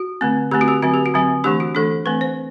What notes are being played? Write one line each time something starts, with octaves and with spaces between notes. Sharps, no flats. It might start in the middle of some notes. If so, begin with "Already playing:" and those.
Already playing: F#4
D3 A3 C4
D3 A3 C4 G4
F#4
G4
D3 F#3 C4 F#4
G4
F#4
D3 F#3 C4
E3 A3 D4 G4
F#4
E3 A3 D4 A4
E3 A3 C4 B4
C5